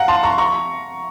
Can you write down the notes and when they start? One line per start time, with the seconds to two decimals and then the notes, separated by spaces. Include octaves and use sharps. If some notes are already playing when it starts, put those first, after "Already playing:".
Already playing: F5 F#5 A#5
0.08 A5 C6
0.23 A#5 C#6
0.38 A#5 C#6